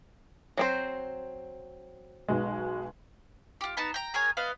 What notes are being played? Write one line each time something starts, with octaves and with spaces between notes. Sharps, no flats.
F#3 C4 C5
B1 B2 G#3
F4 G4
B3 D#4 A5 B5
G5 A#5
G#4 A#4 C#5 G#5
B3 B4 D#5 F5